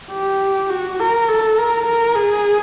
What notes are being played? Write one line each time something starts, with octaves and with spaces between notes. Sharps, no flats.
G4
F#4
A#4
A4
A#4
A#4
G#4